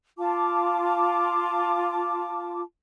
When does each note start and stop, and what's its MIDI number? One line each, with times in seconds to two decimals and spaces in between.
0.18 2.61 65
0.18 2.61 81
0.18 2.61 86